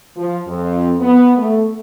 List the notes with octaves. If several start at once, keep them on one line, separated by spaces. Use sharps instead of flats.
F3
F2
B3
A3